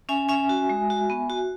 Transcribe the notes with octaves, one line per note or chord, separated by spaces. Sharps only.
C#4 E5 G#5
C#4 E5 G#5
F#4
G#3
F#4
B3
F#4